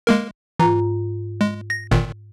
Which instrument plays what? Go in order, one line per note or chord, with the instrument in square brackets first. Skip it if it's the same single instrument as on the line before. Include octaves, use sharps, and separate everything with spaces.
[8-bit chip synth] G#3 A#3 A#4
[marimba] G#2 F4 A#5 [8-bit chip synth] E3
[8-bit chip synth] G#3
A#6
G1 A#2 D#3